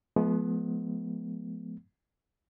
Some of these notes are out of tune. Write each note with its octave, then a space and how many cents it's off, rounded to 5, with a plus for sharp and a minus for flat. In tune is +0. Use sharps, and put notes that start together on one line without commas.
F3 +0 G#3 +40 B3 +0